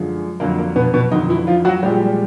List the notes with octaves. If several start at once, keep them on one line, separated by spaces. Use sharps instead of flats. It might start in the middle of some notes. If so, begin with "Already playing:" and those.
Already playing: F#2 D3 F3 G#3
F2 D3 F#3 A#3
A#3
B2 B3
B2 B3
F2 D3 D#3 F#3 D#4
E3 E4
F3 F4
F#3 F#4
A#2 F3 G3 G#3 G4